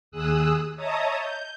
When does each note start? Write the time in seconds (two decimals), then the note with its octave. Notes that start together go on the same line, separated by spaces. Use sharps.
0.11 D#2 G#4 D#6 E6 F#6
0.76 C#5 D#5 E5 A5 A#5 D#6
1.17 G6